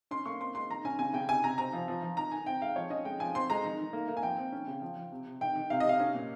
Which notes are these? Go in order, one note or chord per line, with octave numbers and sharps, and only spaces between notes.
C#4 C6
A#3 C#6
C4 C6
G#3 C6
D#3 A#5
C#4 G#5
C#3 G#5
C#3 G5
C3 G#5
C3 A#5
C4 A#5
F3
F3
F3
D#3 A#5
D#3 G#5
C4 G5
G#3 F5
F3 C#5
C#4 D#5
G#3 G5
F3 G#5
C4 C6
G#3 A#5
D#3
D#3
A#3
A#3
G#5
F3 G5
C4
C#4
C#3
F3
F3
C3
C3
D#3 G5
D#3
C3 F5
D#5
C3 F5
C#4
A#2